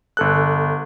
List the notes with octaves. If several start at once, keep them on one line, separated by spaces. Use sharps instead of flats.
G1 A4 F#6